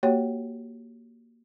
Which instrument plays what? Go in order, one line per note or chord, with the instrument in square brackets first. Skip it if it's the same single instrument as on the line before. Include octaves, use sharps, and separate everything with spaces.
[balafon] A#3 F#4 G4 C#5 G5